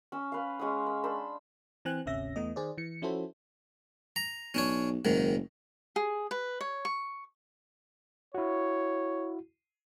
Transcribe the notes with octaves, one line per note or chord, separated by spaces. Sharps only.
C#4 E6
B4 F5
G#3 C#4 C#5 D#6
B5
D4 C5 B5 E6
E3 C4 G#5 F#6
G1 D2 C3 C#4 E5 A#6
E2 E3 A3 B3 D#5
D#3 G#4 C5 D5
E3 C#7
F3 C#4 E4 F#4 A4 C5
A#5
B1 C#4 D4 C#5
F#1 G#2 D#3
G#4
B4
C#5
C#6
E4 F#4 C#5